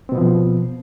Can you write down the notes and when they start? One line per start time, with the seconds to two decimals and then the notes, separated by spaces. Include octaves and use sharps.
0.09 C4
0.12 B2
0.15 B3
0.18 F3